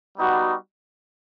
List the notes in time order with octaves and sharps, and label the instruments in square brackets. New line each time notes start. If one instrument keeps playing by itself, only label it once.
[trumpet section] G3 B3 D#4 F#4